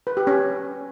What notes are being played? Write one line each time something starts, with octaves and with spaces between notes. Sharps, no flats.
B4
G4
C#4